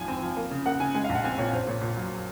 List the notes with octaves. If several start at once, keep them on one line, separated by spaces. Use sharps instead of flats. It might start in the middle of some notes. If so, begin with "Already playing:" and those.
Already playing: G#1 F3 G#5
C4
F3
A#3
C#3
A#3 F#5
C#3 G#5
G#3 G#5
F5
A#1
F#5
C4 G#5
A#2 C#5
A#1 C5
A#2 C#5
A#2
F#3